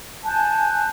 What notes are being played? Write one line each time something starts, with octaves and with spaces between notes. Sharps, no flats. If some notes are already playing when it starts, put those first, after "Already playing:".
G#5 A5 F#6 G6